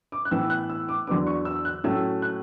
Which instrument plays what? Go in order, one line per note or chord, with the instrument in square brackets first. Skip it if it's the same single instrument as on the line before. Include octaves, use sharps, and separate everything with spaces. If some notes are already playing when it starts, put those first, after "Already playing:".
[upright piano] D6
F#6
A2 E3 B3 E6
F#6
E6
D6
E2 D3 F#3 B3 D4 D6
C#6
E6
F#6
A2 F#3 A3 C#4 E6
F#6